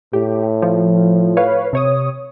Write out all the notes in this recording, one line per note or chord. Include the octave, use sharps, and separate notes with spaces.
A2 G4
F3
B4 C#5 F5
C3 C#5 D#6